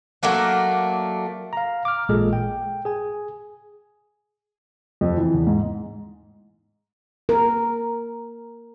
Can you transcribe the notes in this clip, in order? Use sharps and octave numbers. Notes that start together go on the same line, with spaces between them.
F#3 A3 A#3 D4
F5 A#5
D6 F6
A1 A#2 G#3 G#4 A4
G5
G#4 G#5
F2
E3
E2
G#2
A#4